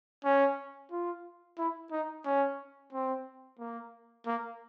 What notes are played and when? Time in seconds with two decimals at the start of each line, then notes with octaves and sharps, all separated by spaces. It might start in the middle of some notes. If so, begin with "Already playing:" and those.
0.25 C#4
0.91 F4
1.58 E4
1.92 D#4
2.26 C#4
2.93 C4
3.59 A#3
4.26 A#3